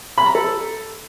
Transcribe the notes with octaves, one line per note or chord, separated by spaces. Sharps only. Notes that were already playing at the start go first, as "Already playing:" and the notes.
B5
A#5
A4